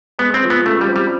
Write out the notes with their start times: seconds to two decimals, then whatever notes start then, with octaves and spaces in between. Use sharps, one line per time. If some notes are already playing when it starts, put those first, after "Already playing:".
0.19 G#3 B3
0.34 C4
0.42 F3
0.50 B3
0.66 C#3 A3
0.81 G3
0.88 C4
0.96 G3